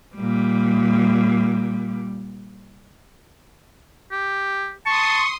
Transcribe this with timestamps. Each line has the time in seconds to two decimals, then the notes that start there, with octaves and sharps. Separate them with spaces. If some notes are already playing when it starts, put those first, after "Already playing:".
0.16 A#2 G3
4.12 G4
4.86 A5 C6 C#6 D#6